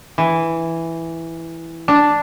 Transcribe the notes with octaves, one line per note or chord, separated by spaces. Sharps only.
E3
D4